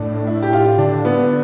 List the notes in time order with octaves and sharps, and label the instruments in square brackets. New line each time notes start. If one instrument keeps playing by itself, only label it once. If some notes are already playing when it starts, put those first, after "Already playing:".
Already playing: [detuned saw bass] A2 [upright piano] D4
[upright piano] E4
G4
F4
[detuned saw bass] D3 [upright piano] D4
[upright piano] B3